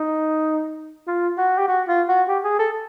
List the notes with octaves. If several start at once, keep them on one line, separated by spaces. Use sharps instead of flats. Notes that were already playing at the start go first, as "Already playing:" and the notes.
Already playing: D#4
F4
F#4
G4
F#4
F4
F#4
G4
G#4
A4